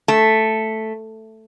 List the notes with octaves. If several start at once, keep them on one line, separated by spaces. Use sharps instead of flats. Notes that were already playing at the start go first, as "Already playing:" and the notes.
A3